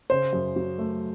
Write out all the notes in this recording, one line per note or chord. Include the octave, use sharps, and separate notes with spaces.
C#3 C5
F#2
F#3
A3